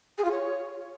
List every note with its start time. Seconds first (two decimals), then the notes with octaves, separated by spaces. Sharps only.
0.18 G#4
0.24 F4
0.31 C#5